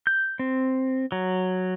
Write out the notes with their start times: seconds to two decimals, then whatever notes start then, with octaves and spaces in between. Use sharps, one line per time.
0.07 G6
0.39 C4
1.12 F#3